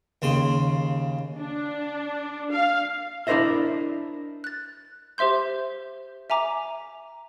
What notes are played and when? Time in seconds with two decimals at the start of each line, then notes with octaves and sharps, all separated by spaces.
0.22 D#2 C#3 C6
1.39 D4
2.53 F5
3.27 D4 E4 A#4 C5 D#5 E5
4.44 F#6 A6
5.18 G4 C5 E5 C6 G6
6.30 E5 G#5 A#5 D6